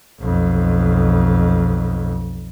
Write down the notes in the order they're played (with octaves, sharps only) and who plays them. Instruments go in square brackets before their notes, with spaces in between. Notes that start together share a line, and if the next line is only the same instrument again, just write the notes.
[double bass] B1 F2